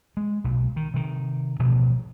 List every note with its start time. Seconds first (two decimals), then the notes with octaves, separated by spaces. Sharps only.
0.17 G#3
0.44 B1 A#2
0.76 D#3
0.94 C3 D#3
1.59 A1 G2 B2 F3